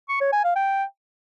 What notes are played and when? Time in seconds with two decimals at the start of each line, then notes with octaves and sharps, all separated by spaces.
0.09 C#6
0.21 C#5
0.32 G#5
0.44 F5
0.56 G5